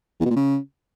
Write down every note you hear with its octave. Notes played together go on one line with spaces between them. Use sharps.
E2
B2
A#2
C#3